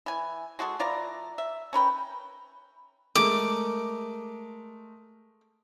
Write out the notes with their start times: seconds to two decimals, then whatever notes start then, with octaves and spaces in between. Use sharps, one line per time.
0.06 E3 G#5
0.59 G#3 F#4 G#4 A4
0.79 E3 F4 D5 A#5
1.38 E5
1.73 C#4 A#4 B4 G5
3.15 G#3 A3 A#4 D6